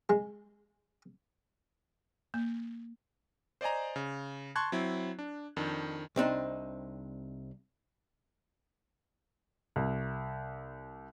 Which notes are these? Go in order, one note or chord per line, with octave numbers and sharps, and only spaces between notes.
G#3
A#3
C5 D5 D#5 G#5 A#5
C#3
A5 C6 C#6 F#6 G#6
F#3 C4 E4
D4
F2 D#3 D4
C2 C4 D4 D#4
C2